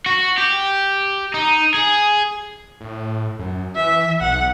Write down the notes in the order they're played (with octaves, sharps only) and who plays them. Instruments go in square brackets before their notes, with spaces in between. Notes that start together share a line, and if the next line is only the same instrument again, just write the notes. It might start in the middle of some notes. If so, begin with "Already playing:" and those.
[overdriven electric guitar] F#4
G4
D#4
G#4
[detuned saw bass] A2
F#2
[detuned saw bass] E3 [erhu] E5
[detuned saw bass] B1 [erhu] F#5